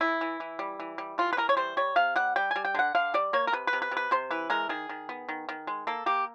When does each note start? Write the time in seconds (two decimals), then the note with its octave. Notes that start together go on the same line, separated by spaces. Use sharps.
0.01 E3 E4
0.21 E3
0.40 E3
0.59 G3
0.80 E3
0.98 G3
1.18 E3 F4
1.33 B4
1.37 E3 A#4
1.49 C#5
1.57 G3 C5
1.77 G3 C#5
1.96 C3 F5
2.16 G3 F#5
2.36 G3 G5
2.51 G3 G#5
2.65 G5
2.74 D3 F#5
2.95 D3 F5
3.14 G3 D5
3.33 A#3 C#5
3.47 A#4
3.53 C3 B4
3.67 B4
3.73 C3
3.82 B4
3.91 C3
3.97 B4
4.11 C3 C5
4.31 E3 B4
4.50 G#3 A#4
4.69 D#3 G#4
4.89 D#3
5.09 B3
5.29 D#3
5.49 D#3
5.67 G#3
5.87 A#3 A4
6.06 A#3 G4